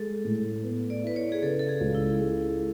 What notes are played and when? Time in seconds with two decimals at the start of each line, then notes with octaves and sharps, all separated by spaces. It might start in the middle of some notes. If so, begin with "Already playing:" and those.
Already playing: G#3 A4
0.25 A2
0.64 B3
0.90 D5
1.03 E4 B4
1.16 C#5
1.32 G#4
1.42 C#3 A4
1.59 A4
1.69 G#4
1.81 C#2
1.95 E4
2.21 G#3